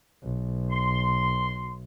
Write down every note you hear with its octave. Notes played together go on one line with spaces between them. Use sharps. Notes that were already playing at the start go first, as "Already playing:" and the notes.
B1
C6